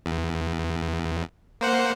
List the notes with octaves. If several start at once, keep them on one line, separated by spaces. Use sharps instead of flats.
E2
A#3 C5 F#5